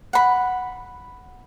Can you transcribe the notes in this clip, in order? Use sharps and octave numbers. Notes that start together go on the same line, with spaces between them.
F#5 B5